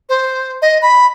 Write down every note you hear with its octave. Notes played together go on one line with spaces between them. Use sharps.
C5
D#5
B5